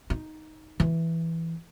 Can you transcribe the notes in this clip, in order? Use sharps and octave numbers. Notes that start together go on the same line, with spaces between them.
D#4
E3